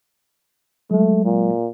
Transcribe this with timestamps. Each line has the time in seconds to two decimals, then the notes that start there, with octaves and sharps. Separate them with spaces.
0.91 F#3 G#3 A3
1.25 A#2